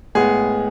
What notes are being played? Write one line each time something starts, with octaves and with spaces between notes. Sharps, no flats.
A2 G#3 B3 G#4